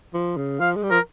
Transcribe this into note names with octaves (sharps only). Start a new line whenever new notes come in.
F3
C#3
F3 F5
G#3
G3
F3 A#4